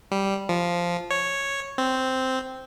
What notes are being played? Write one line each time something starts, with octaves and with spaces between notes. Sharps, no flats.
G3
F3
C#5
C4